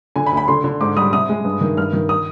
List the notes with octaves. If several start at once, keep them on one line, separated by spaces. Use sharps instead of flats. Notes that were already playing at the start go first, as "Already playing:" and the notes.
D3 G#5
B5
D2
B5
D3 C6
D3
G#2 D6
G3 D#6
C3 D#6
G#3
G2
D#3
G2 F6
D#3
D#6